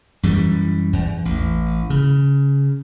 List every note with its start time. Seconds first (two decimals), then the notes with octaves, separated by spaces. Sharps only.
0.23 F#2 E3 G3
0.93 E2
1.25 A1
1.90 C#3